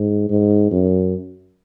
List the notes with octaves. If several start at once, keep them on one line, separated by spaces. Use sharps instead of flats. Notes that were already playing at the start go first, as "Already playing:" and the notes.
Already playing: G#2
G#2
F#2